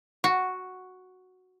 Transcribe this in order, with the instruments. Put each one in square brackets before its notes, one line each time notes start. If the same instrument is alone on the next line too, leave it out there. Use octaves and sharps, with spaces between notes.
[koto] F#4